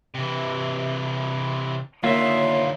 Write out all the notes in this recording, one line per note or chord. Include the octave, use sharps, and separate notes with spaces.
C3 E3
D2 D#3 A#3 F4 C#5 E5